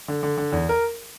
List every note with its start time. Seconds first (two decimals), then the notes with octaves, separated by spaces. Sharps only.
0.08 D3
0.23 D3
0.38 D3
0.52 E2
0.69 A#4